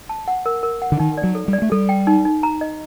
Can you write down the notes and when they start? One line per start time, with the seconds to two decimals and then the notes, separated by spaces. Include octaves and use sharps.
0.09 A5
0.28 F#5
0.46 A#4
0.63 A#4
0.82 F#5
0.92 D3
1.00 D#3 D#4
1.18 D5
1.24 F#3
1.35 A4
1.48 G3
1.53 D5
1.62 A3
1.72 G3 A4
1.89 G5
2.07 D#4
2.25 D#4
2.43 A#5
2.61 D#5